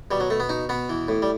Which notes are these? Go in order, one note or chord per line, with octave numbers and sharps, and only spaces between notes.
B2 G3
F#3
B2 A3
B3
B2 D#4
B2 B3
E3
A2
G3